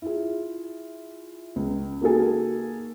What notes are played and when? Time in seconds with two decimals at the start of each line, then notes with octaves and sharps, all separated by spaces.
0.02 E4 F4 G#4
1.56 C#2
2.01 A#3 D#4 F#4 G#4 A4 G#5